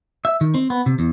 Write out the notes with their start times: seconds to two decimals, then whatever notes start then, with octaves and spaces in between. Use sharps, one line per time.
0.25 E5
0.41 D#3
0.54 C4
0.70 B3
0.86 C3
0.99 E2